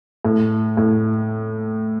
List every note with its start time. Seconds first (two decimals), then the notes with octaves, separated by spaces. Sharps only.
0.25 A2
0.77 A2